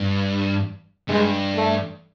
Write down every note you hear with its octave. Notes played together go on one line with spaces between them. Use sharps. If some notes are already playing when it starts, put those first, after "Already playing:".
Already playing: G2
G2 G#3
A3